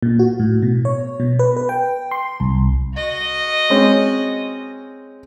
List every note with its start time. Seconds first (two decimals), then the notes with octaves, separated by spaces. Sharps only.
0.03 A#2
0.19 F#4
0.40 A2
0.62 B2
0.85 C#5
1.20 B2
1.39 B4
1.57 B4
1.69 G5
2.11 C6
2.40 C2
2.94 F#4 D#5
3.70 G#3 C4 C#4